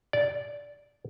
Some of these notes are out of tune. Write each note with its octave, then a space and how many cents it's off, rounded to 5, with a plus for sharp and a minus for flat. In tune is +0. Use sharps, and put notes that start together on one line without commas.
D5 -15